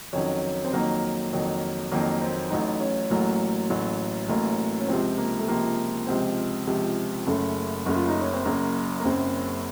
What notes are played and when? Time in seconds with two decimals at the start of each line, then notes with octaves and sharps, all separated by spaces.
0.13 F2 D#3 F#3 C#4
0.64 C4
0.73 F2 D#3 F#3 A#3
1.33 F2 D#3 F#3
1.91 F2 D#3 F#3 A#3
2.22 C4
2.50 A1 A2 F#3 D#4
2.80 C#4
3.10 A1 A2 F#3 A#3
3.70 A1 A2 F#3
4.29 A1 A2 F#3 A#3
4.80 C#4
4.88 C#2 C3 F3 C4
5.18 A#3
5.39 A3
5.48 C#2 C3 F3 A#3
6.07 C#2 C3 F3 C4
6.67 C#2 C3 F3
7.26 F#1 F#2 C#3 A3
7.86 F#1 F#2 C#3
7.95 F4
8.08 D#4
8.21 C#4
8.33 C4
8.45 F#1 F#2 C#3 A#3
9.00 A#3
9.04 F#1 F#2 C#3 C4